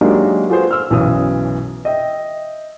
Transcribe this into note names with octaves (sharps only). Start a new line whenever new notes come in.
F#3 G#3 A#3 D4 D#4 G4
F4 F#4 G#4 A4 B4 C5
E6 F6
B1 F#2 E3 D#6
D#5 E5 G5